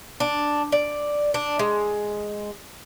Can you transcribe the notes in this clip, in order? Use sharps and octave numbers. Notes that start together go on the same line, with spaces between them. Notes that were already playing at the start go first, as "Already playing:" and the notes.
D4
D5
D4
G#3